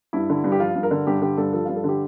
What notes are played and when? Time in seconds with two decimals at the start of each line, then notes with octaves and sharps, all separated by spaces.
0.13 G2 E4
0.30 D3
0.44 G2
0.52 G4
0.60 F3 F4
0.75 G2
0.83 A#4
0.91 D3
1.07 G2 G4
1.22 D3 G4
1.38 G2 A4
1.53 F3 A4
1.65 G2 F4
1.76 A4
1.84 D3 G4